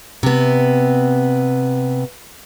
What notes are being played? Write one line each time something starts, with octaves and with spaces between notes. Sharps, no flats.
C3 B3